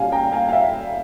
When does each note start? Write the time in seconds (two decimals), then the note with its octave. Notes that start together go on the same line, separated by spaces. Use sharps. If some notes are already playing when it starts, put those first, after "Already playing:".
Already playing: A#2 G3 C#4 F5 G#5
0.12 G5 A#5
0.32 F5 G#5
0.49 F5
0.52 E5 G5